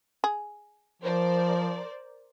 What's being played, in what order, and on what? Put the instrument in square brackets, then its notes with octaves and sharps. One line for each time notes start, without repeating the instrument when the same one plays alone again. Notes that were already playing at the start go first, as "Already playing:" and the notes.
[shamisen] G#4
[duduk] F3 [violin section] A#4 C5 D5